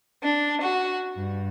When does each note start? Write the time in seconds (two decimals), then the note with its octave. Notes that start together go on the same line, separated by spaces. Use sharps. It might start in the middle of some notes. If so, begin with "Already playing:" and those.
0.23 D4
0.61 F#4
1.15 G2